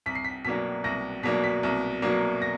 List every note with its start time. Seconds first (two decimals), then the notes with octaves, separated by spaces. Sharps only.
0.06 C2 B6
0.15 C7
0.24 B6
0.45 B2 F#3 A#3 D4 B6
0.84 C2 A#6
1.23 B2 F#3 A#3 D4 B6
1.44 B6
1.63 C2
2.02 B2 F#3 A#3 D4
2.42 A#6